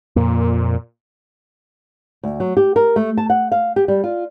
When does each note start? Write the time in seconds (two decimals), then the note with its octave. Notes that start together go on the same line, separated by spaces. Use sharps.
0.16 F2 A#2 A#3
2.23 D2
2.40 F#3
2.57 G4
2.76 A#4
2.96 A3
3.18 A5
3.30 F#5
3.52 F5
3.76 G4
3.88 G3
4.04 F4